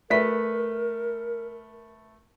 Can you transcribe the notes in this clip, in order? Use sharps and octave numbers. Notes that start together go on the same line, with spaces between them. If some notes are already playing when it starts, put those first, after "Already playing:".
A3 A#4 B4 B6